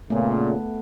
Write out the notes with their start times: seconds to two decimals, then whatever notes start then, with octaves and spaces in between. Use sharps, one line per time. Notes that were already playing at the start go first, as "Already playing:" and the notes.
0.10 A#2 C#3 A3 B3